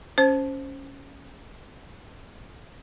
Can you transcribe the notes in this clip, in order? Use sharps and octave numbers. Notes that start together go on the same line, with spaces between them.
C#4 C5